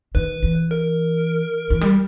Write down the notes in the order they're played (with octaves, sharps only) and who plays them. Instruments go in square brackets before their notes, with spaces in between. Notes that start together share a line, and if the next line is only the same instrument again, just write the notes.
[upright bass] D#3 [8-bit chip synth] B4
[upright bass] E3
[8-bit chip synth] A#4
[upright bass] E3
G3